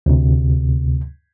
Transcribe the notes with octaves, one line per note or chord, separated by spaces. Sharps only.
D2 C3